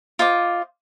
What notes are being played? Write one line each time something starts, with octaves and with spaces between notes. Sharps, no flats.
F4 C5 D#5 D6